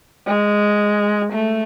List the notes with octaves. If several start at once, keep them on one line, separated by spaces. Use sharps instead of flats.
G#3
A3